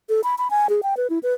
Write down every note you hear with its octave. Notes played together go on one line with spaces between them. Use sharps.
A4
B5
B5
G#5
G#4
G5
B4
E4
B4